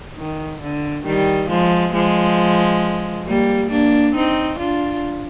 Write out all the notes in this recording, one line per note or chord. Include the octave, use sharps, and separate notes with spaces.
D#3
D3
D#3 G3
F3 G#3
F3 G#3
G3 A#3
A#3 D4
C4 D#4
D4 F4